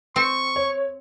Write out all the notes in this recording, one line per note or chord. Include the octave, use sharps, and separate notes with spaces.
C4 C#6
C#5